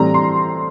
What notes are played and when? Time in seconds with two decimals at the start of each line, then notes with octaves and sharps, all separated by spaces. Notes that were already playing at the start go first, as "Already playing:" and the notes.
Already playing: A2 E3 G3 C4 A#5
0.14 C6